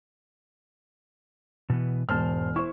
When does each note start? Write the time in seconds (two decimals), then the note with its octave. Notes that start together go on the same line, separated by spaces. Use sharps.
1.70 B2 E3 B3
2.09 E1 G#2 C5 A5 F6
2.56 E4 C5 C#6